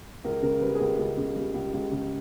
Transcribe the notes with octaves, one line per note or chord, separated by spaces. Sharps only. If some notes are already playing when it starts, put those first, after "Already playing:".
C#2 A#4
C#3 A#4
G3 B4
G#4
C#2 A#4
C#2 G#4
C#3
G3
C#2
C#2
C#3